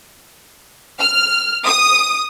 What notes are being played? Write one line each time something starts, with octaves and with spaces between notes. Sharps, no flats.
F6
D#6